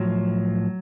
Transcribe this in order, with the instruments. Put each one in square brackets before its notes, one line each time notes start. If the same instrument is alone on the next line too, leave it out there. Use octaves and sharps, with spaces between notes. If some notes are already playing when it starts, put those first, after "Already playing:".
Already playing: [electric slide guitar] A2 F3 F#3